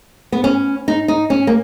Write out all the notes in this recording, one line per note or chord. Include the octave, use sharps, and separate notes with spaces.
B3
C#4
D#4
D#4
C#4
A#3